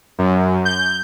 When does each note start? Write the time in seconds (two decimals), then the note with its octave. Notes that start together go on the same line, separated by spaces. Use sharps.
0.19 F#2
0.65 G6